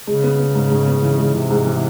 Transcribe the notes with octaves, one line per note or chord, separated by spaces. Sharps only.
C#3 G#3
B3
B3
G#2
G#2
B3
E3
G#3
C3 E3
G#2
E3